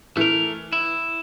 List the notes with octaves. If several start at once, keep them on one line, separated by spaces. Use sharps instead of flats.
E3 A3 A#4
E4